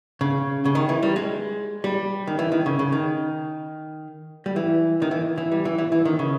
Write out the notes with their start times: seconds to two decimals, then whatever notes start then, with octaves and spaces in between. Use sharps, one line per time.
0.21 C#3
0.65 C#3
0.75 D#3
0.89 E3
1.03 G3
1.16 G#3
1.84 G3
2.27 D#3
2.39 E3
2.52 D#3
2.66 C#3
2.79 C#3
2.92 D#3
4.46 G3
4.56 E3
5.02 D#3
5.11 E3
5.38 E3
5.52 G3
5.65 E3
5.78 E3
5.92 E3
6.05 D#3
6.19 C#3